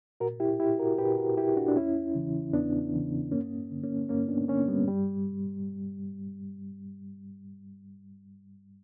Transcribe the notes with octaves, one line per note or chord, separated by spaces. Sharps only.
A#2 F#4 A#4
E4 G4
E4 G4
F#4 A#4
A#2 G4 B4
F#4 A#4
E4 G4
D4 F#4
D4
E2 C#4 E4
C#3 E3
E2 B3 D4
C#3 E3
G2 A#3 C#4
D3
A#3 C#4
G2 A#3 C#4
B3 D4
D3 A#3 C#4
G3 B3
G2 G3